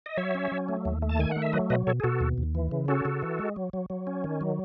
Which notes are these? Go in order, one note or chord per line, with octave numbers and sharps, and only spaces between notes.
D#5
F#3 C#5 E5
C#4
F#3
A3
D#2
A3
A5
D#3 G#5
A3 F#5
E5
F#3 B4 D#5
B2 B4 D#5
B2 A4 C#5
G#4
B2 F#4 A4
D#2
D#2
E3
C#3
C#4 F#4 A4
C#3
E3
G#3
F#3
F#3
F#3
C#4
D#3
F#3